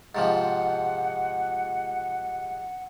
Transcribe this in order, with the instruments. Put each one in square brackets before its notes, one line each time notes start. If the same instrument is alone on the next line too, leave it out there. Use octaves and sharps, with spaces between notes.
[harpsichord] G#2 C3 F3 [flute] F#5